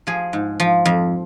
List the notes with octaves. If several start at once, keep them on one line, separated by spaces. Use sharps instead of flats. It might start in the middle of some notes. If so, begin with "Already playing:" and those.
F3 G#4
G#2
F3
F2